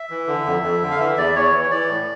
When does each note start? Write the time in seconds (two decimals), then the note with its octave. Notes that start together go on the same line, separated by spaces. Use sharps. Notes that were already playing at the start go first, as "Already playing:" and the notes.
Already playing: E5
0.10 E3
0.27 D3
0.46 F2
0.63 F2
0.82 D3
0.91 F5
0.99 E3 E5
1.17 E2 D5
1.35 E2 C#5
1.53 E3
1.63 C#5
1.71 E3 D5
1.89 A2